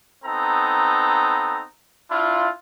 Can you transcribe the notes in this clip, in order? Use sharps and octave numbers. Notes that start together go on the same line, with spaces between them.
B3 C4 D#4 A4 A#5
D4 E4 F4